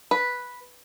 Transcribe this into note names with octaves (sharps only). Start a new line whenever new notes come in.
B4